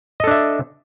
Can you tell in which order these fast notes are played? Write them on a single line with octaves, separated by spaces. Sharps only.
D#5 A4 D4 E5